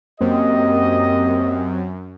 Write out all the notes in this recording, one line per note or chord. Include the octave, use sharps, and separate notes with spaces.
F#2 A#3 C4 G4 A#4 D#5